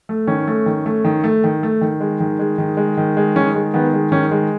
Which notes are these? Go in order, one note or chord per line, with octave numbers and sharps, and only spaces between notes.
A3
D#3 C#4
A3
D#3
A3
D#3
A3
D#3
A3
D#3
G#3
D#3
G#3
D#3
G#3
D#3
G#3
D#3 C#4
G#3
D#3 B3
G#3
D#3 C#4
G#3